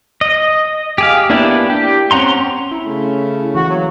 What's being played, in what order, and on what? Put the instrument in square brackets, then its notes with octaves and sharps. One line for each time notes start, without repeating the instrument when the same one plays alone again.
[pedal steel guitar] D#5
G4 G#4 F5
A#3 B3 D4 E4 G4
G4
C4 C#4 F#5 A#5 C6
[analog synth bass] E4
[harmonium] C#3 A3 C#4
[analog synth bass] E3 [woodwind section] F#4
[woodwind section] F#3 [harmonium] A#3